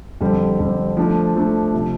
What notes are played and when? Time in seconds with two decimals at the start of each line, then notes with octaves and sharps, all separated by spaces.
0.21 F2 D3 G3 C4
0.59 F2 D3 G3 C4
0.97 F3 A3 D4
1.35 F3 A3 D4
1.74 C3 F3